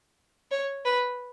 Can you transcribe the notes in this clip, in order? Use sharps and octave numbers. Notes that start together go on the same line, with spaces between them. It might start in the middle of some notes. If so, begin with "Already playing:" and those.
C#5
B4